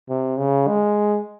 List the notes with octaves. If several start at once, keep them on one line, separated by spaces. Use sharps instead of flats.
C3
C#3
G#3